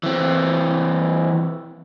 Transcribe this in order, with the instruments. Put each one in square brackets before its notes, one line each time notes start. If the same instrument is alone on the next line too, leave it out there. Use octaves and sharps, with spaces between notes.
[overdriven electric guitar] E3 C4